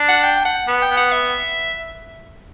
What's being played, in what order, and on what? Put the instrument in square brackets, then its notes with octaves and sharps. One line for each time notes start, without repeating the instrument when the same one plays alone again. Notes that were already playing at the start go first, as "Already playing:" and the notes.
Already playing: [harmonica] D4
[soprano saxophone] F#5
G5
F#5
[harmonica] B3
[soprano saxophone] G5
[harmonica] B3
[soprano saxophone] F#5
E5